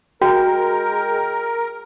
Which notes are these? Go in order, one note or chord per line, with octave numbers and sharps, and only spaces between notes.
G#3 F#4 A#4 G5